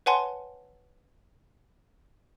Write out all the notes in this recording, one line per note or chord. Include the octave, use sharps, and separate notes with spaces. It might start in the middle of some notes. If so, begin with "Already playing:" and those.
B4 C#5 F#5 G#5 A5 C6